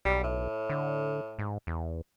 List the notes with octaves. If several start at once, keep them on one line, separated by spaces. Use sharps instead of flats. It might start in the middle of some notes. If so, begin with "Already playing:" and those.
B1 G3
A2
D3
G#2
E2